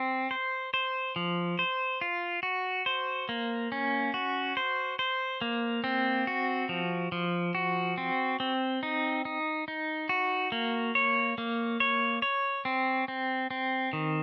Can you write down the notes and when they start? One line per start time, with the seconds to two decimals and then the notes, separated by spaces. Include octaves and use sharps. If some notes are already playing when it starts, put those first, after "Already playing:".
Already playing: C4
0.31 C5
0.74 C5
1.16 F3
1.59 C5
2.01 F4
2.43 F#4
2.86 C5
3.29 A#3
3.72 C#4
4.14 F#4
4.57 C5
4.99 C5
5.41 A#3
5.84 C4
6.27 F#4
6.69 F3
7.12 F3
7.55 F#4
7.98 C4
8.40 C4
8.83 D#4
9.25 D#4
9.68 D#4
10.09 F#4
10.52 A#3
10.95 C#5
11.38 A#3
11.80 C#5
12.22 C#5
12.65 C4
13.08 C4
13.51 C4
13.93 D#3